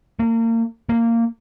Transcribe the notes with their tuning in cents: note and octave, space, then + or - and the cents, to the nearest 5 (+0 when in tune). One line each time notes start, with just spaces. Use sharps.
A#3 -35
A#3 -15